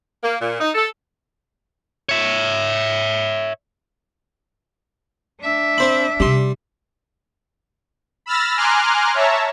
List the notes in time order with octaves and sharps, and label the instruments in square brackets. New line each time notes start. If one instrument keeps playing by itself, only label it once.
[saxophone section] A#3
A#2
D#4
A4
[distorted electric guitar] C#5 E5
[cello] D4 E5
[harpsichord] C4 C5 B5
[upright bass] C3 D#4 [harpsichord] G3 C6
[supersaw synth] B5 E6 F6 A6 A#6
G#5 A#5 C6 D6 F6 F#6
C#5 E5 A5 A#5